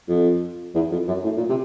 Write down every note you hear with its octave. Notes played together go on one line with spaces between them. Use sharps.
F2
E2
F2
F#2
A2
A#2
C3